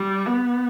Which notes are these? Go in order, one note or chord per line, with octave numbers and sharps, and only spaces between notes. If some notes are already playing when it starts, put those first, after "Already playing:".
Already playing: G3
B3